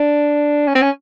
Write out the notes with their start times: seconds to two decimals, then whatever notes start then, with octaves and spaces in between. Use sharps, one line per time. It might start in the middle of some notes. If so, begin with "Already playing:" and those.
Already playing: D4
0.67 C#4
0.75 C4
0.82 C#4